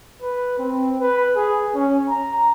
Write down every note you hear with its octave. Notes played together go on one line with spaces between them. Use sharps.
B4
C4
B4
G#4
C#4
A#5